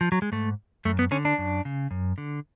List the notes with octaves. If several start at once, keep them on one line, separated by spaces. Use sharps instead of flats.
F3
F#3
G#3
G#2 A3
F#2 A3
B3
D3 C#4
D4
F#2
C#3
F#2
D3